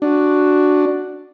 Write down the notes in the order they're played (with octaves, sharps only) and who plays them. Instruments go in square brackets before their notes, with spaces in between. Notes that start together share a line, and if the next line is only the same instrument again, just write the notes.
[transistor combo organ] D4 [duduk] F#4